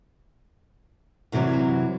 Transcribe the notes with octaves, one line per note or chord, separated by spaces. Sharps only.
F#2 C3 E3 F#3 G3